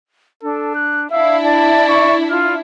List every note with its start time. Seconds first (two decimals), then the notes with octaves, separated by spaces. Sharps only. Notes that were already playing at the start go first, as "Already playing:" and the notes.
0.43 D4 A4
0.75 F#6
1.11 D4 E4 E5 F5
1.44 D5 A5
1.88 C#6
2.30 F4 F6